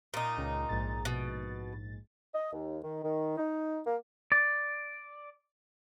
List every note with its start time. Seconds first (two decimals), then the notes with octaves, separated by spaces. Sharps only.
0.14 A#2 D#4
0.38 C#2
0.69 A#1 G#2 A6
1.05 B2
2.35 D#5
2.53 D#2
2.83 D#3
3.04 D#3
3.37 D#4
3.85 A#3
4.32 D5